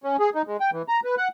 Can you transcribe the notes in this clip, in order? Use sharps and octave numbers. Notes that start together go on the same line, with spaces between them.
C#4
G#4
D#4
G#3
G5
E3
A#5
B4
F#5